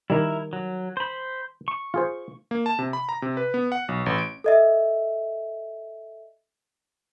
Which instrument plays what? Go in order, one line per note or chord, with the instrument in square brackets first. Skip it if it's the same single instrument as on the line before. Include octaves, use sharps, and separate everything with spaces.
[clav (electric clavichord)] D#3 G3 [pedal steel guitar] E4 A#4
[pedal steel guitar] F#3
C5 B5
C#6
[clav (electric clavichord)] F4 G#4 C5
[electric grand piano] A#3
A5
C3
B5
A#5
C3
B4
B3
F#5
B1
A1
D7
[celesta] A4 D#5 E5